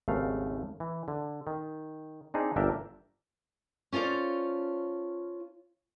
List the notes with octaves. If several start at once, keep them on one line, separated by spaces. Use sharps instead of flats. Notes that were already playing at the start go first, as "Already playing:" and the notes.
G#1 D#2 C#3 A3 F5
E3
D3
D#3
C4 D4 D#4 G#4
G1 A#2 D4 A#4 E5 G5
C#4 F4 A4 C5 D5